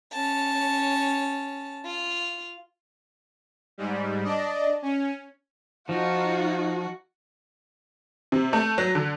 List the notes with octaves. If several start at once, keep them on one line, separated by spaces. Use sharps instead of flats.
C#4 A5
F4
G#2 G3
D4 D5 D#5
C#4
F3 D#4 F4 F#4
C3
A3
F#3
D3